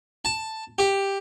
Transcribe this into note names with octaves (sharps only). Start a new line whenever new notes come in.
A5
G4